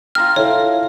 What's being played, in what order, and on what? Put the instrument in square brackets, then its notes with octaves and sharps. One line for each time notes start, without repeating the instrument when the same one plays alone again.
[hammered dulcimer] F4 A#4 G5 [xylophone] F6
[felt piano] E4 A4 E5 [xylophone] C#5